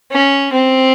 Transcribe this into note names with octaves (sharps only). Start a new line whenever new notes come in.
C#4
C4